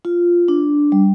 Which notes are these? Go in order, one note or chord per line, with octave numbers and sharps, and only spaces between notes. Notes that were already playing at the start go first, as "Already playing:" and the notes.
F4
D4
G3